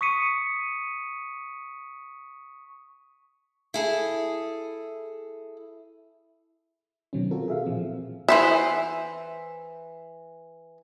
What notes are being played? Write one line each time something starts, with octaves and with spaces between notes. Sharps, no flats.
C#6 D#6 B6 C#7 D#7
E4 G#4 A4
B2 D#3 F#3 C4 C#4
C4 F4 F#4 A4 A#4
G#4 E5 F5
A#2 E3 F3 C4
E3 C5 E5